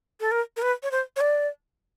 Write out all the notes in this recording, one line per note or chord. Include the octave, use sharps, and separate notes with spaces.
A4
A#4
A#4
B4
C#5
C5
C#5
D5